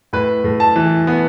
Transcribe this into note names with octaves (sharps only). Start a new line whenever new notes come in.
A2 B4
A2
A5
E3
B3